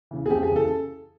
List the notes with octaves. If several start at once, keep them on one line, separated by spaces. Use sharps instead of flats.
C#3 E3
G#4
F2 G4
G#4
C#3 E3
A4